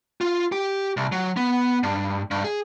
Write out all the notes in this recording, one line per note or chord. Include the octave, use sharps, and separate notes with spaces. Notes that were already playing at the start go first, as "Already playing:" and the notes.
F4
G4
C2
F#3
B3
G2
G2
G#4